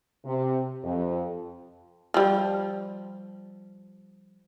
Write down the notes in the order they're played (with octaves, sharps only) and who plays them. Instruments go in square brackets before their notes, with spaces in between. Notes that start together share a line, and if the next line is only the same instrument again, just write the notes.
[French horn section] C3
F2
[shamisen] F3 G3